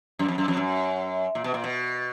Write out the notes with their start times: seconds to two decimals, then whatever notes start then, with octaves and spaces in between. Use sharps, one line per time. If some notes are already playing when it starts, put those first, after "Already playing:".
0.19 F#2
0.28 F2
0.38 F#2
0.48 F2
0.57 F#2
1.35 A#2
1.44 B2
1.54 A#2
1.64 B2